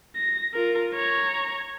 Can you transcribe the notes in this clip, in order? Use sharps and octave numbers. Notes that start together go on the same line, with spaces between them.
A#6
F4 A#4
C#5 A#5